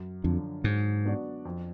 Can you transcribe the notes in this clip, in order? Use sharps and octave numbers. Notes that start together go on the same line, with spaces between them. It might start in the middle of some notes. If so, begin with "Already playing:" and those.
Already playing: F#2
F2 D3 F3
G#2 F#3
B3 D4 F#4 D5
F2